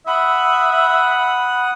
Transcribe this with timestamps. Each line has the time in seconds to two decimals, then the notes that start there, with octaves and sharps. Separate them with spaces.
0.07 E5 F#5 B5 D#6